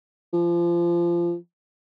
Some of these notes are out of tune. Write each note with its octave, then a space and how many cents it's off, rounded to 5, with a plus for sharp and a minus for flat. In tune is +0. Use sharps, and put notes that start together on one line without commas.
F3 -25